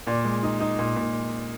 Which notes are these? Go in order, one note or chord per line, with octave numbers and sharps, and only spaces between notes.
A#2 D5
G#3
D#4
D#4
A#2
A#2